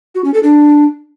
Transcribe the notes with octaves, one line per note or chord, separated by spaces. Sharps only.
F#4
C#4
A4
D4